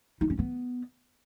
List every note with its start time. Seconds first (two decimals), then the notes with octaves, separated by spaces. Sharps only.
0.21 D#4
0.30 C#4
0.39 B3